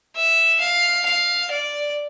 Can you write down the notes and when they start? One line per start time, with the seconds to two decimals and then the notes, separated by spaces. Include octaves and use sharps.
0.15 E5
0.60 F5
1.05 F5
1.51 D5